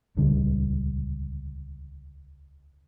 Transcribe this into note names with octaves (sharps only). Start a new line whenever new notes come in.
D#1 C#2 D3 G3